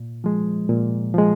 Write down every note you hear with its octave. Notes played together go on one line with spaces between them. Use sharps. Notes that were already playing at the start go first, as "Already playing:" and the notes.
Already playing: A#2
F3 G#3
A#2
F3 G#3